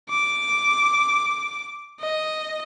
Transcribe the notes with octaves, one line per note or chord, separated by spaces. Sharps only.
D6
D#5